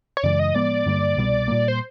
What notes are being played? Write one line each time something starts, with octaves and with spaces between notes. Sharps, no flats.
C#5
F#2 C#3 E3 G#3 D5
D#5
A2 F3 G#3 B3 D5
G2 D3 G3 A#3
C2 B2 G3 B3
A#2 G3 A#3
C5